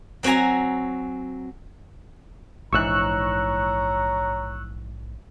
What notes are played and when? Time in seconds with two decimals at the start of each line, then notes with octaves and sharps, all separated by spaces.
0.23 F#3 C4 F#4 G#5 A#5
2.73 A#1 G#2 E3 C#5 A#5 C#6 E6 F#6